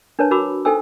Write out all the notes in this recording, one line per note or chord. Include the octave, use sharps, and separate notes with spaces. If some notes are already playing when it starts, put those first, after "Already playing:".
D4 A#4 B4 C#5 A5
F#4 A#4 A#5 B5 D6 E6
D#4 A4 C5 G5 G#5 E6